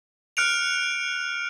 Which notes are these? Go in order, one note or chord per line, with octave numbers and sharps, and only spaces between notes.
F6 F#6 C#7 D7 F7